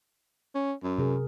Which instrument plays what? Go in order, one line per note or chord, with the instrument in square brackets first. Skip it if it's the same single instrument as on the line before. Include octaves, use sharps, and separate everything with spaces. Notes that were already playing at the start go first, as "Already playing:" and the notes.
[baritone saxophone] C#4
F#2
[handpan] C3 G#4 A#4